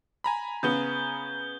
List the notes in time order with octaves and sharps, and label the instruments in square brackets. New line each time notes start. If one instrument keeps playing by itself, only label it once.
[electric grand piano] G#5 A#5 B5
[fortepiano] C#3 B3 [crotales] G6 G7